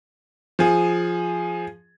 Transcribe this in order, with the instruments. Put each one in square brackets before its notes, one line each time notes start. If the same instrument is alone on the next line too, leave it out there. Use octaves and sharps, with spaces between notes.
[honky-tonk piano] F3 G#4